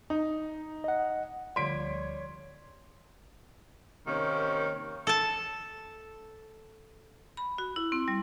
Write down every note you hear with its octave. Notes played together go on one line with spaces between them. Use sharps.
D#4
D#5 F#5
D2 F3 G3 C#5 D5 C6 B6 D7
C3 D#3 A#3 C#4
A4 A5
B5
F#4
E4
C4
G3